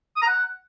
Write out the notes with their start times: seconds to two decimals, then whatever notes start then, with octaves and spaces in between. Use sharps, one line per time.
0.16 D#6
0.22 A#5
0.27 F#5